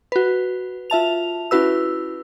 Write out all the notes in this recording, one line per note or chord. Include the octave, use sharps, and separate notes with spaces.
F#4 B4
F4 E5 A5 F7
C#4 E4 F#4 B4 E6